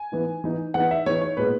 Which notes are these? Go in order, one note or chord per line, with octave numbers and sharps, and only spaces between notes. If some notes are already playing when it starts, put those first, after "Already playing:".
Already playing: G#5
E3 B3 D#4
E3 B3 D#4
E3 B3 D#4 F#5
E5
E3 B3 D#4 C#5
C#5
A#2 G#3 B3 D#4 B4